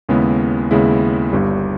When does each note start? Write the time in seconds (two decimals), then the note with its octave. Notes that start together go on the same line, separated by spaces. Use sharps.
0.09 D#2 C#3 G#3 B3 E4
0.71 D#2 C#3 G#3 B3 E4
1.33 G1 G2 G3